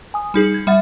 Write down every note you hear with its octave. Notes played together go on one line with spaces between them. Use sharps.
G#5 D#6
G3 D#4 G#4
G#6
G3 E5 F#5 A6